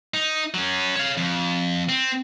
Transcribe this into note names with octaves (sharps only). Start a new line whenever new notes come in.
D#4
F#3 C#4
C#5 F5
F2
C4